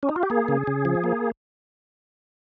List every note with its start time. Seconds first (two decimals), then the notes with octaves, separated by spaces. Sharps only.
0.03 C#4
0.09 D#4
0.16 F4
0.23 G4
0.30 A#3 G#4
0.48 C#3
0.67 C#3
0.85 F3
1.04 A#3